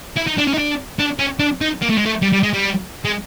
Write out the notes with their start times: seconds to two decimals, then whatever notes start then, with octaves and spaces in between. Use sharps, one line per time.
0.16 E4
0.27 D#4
0.38 D4
0.47 C#4
0.54 D#4
0.58 D4
0.99 D4
1.19 C#4
1.39 D4
1.61 D#4
1.82 A#3
1.89 A3
1.98 G#3
2.06 A3
2.22 G3
2.33 G3
2.43 G#3
2.53 G3
3.05 G#3